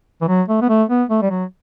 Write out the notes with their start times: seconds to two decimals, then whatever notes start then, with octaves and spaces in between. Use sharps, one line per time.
0.21 E3
0.28 F#3
0.48 A3
0.62 B3
0.69 A3
0.89 B3
1.09 A3
1.22 G3
1.30 F#3